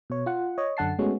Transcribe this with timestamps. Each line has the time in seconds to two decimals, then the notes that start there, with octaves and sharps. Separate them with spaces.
0.10 B2 C#5
0.26 F4 F#5
0.58 C#5 D#5
0.77 F#2 D3 F#5 A5 C7
0.99 G#3 A3 B3 C#4 F#4